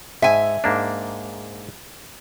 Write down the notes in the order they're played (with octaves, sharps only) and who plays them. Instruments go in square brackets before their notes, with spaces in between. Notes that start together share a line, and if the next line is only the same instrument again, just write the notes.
[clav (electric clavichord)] G#2 [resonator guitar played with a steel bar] E5 G#5
[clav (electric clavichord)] G#2 A#3 D4